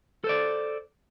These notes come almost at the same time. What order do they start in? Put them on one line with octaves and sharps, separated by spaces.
A4 C5 D5